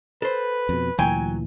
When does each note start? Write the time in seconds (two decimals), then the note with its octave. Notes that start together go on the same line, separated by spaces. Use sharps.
0.22 A4 B4 C5
0.69 F2 B2
0.99 D2 A#2 E3 F#3 G5 G#5